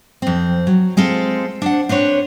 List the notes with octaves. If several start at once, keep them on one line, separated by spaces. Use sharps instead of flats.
F2 C4
F#3
G#3 C4 F4 A4
D4 C5 F#5
C4 D4 B4 C#5